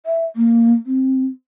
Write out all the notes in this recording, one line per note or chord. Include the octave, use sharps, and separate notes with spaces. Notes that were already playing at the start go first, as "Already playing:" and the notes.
E5
A#3
C4